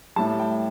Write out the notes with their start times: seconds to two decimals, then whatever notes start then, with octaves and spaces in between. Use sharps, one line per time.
0.16 A2 G3 A5
0.39 G5